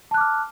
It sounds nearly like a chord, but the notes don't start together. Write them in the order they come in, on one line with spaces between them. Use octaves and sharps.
A5 F#6 D6 F6